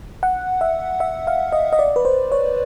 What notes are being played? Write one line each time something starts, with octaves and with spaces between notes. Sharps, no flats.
F#5
E5
E5
F5
D#5
D#5
D5
B4
C5
C#5